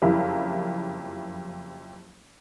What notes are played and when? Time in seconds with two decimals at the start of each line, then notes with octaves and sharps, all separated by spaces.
0.02 F#1 F2 G3 E4 A#4 F5